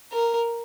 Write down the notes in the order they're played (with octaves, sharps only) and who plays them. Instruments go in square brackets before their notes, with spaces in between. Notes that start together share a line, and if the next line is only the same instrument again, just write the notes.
[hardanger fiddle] A#4